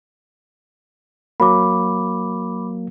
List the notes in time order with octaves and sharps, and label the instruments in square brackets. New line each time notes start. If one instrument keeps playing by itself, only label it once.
[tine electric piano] F#3 A#3 [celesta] B5 D6